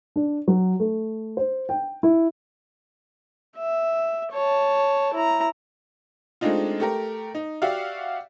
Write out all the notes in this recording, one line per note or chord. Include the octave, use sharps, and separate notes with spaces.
D4
F#3
A3
C5
G5
E4
E5
C#5 A5
E4 A#5
G#3 A3 C4 D4 D#4 F4
A3 G4 A#4
D#4
F#4 G4 D5 E5 F5